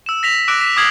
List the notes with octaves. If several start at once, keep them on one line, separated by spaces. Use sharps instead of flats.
E6 E7
A#6 B6 F7
D6 E6 F#6 A#6 D7
B6
D6 D#6 F6 G#6 C7 F#7